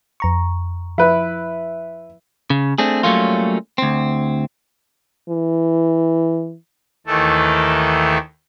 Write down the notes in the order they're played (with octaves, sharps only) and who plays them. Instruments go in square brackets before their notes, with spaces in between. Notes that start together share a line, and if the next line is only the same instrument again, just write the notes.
[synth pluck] F2 A#5 C#6
[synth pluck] F3 [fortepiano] E4 B4
[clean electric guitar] C#3
A3 C4 D4 G#4
F#3 G3 A3 A#3 C#4 F4
D2 C4
[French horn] E3
[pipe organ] D#2 D#3 E3 A3 A4